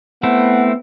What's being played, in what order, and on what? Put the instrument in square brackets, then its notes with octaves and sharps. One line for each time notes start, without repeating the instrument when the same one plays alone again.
[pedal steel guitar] A3 C4 E4 [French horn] B3 [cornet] F#5